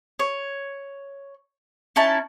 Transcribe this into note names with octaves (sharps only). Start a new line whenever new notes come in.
C#5
C#4 D#4 E4 A5